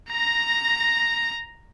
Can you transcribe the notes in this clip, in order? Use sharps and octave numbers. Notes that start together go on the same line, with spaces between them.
A#5 A#6